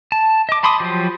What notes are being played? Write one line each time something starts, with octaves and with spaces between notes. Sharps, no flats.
A5
D#5 D6
A5 B5 C6 D6 D#6
F3 F#3 G4 C5